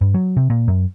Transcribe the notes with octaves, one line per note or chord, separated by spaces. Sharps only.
G2
F#3
C3
A#2
F#2